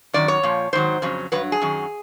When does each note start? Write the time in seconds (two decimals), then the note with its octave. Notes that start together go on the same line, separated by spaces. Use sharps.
0.14 F#2 D#3 F#3 D5
0.28 C#5
0.43 A#2 F3
0.73 G#2 D#3 F#3 C5
1.02 F2 C#3 F#3
1.32 G2 D#3 F#3 B4
1.52 G#4
1.61 F#2 D#3 F#3